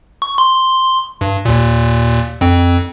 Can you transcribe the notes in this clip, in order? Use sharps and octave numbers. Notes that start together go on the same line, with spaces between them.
C#6
C6
G2
D#2 A#2
F2 C4